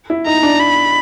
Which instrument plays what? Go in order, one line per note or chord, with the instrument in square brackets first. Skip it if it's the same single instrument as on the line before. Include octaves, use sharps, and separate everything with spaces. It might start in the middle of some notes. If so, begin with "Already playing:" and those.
[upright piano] E4
[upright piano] D#4 [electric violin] A#5
[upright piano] D4
[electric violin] B5